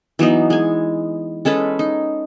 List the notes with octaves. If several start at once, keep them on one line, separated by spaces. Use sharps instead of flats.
E3 F#3 B3 D#4
G#3 G#5
G#3 C#4 A4 B4
D#4